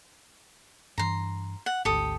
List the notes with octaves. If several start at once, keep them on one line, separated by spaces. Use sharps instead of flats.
G2 E3 A#5 C6
F#5
G#1 D2 G4 A4 D#6